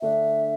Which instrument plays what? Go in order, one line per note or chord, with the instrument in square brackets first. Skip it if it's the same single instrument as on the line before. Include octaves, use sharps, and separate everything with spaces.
[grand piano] D3 A3 D4 [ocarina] E5